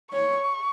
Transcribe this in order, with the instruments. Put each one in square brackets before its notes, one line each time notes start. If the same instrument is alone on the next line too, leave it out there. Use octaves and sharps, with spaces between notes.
[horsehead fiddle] C#5 [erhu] C#6